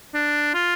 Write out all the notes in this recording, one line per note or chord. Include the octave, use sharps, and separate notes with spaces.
D4
F4